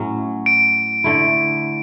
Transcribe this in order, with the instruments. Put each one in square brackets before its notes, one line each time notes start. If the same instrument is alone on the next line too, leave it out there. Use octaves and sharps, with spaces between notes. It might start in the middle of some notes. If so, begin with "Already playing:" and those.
Already playing: [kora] A2 F#3 C#4
[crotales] D7
[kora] D3 A3 E4